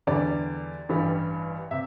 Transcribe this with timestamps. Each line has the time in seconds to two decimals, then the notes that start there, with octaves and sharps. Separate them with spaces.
0.07 E2 D3 G3 D5
0.89 A1 G2 E3 G3
1.71 C3 E5